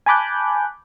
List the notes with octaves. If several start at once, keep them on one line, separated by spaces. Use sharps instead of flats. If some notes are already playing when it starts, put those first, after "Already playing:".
G#5 A5 B5 D6 F#6 G6